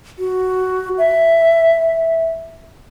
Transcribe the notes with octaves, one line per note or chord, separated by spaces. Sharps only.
F#4
E5